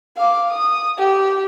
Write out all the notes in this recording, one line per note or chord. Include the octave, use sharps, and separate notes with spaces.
F5 D6
D#6
G4